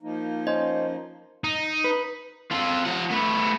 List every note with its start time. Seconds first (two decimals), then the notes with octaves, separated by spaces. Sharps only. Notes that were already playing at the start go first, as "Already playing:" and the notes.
0.02 F3 A#3 D#4
0.47 C#4 C5 D#5
1.44 D#4
1.84 B4
2.51 F4 A4
2.85 F3 F#5
3.10 A3 B3